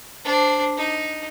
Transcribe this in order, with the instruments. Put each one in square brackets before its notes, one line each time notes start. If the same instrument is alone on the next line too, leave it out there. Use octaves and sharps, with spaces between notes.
[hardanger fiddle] D4 C5
D#4